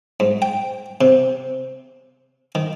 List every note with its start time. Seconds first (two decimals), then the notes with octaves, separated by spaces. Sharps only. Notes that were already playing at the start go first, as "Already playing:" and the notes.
0.20 G#2
0.42 G5
1.01 C3
2.55 D#3